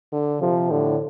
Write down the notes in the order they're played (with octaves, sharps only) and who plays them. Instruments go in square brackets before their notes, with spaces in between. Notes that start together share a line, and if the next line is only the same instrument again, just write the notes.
[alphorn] D3
[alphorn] C3 [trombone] F3
[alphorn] A2 [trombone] D3